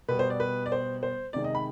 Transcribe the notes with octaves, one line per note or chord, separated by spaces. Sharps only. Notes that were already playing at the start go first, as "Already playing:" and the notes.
B2 G3 B3 B4
C5
D5
B4
D5
C5
C5
C3 D#3 G#3 D5
D#5
B5